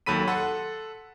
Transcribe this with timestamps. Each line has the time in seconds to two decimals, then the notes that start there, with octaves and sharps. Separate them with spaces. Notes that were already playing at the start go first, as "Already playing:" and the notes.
0.06 D#2 F#3 A4 B5 B6 D#7
0.27 A4 F#5 C6